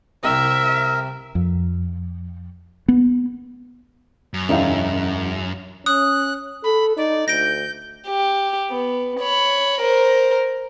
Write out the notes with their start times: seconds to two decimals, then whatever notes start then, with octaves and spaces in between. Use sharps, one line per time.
0.24 C2 C3 A#4 E5
1.35 F2
2.88 B3
4.34 F#2
4.49 E1 C#4 D#4 E4 G4 F5
5.86 C#4 D#6 F#6
6.64 A4 B5
6.97 D#4 D5
7.28 D2 G6 A#6 D7
8.07 G4
8.70 B3
9.20 C#5 B5
9.80 A#4 C5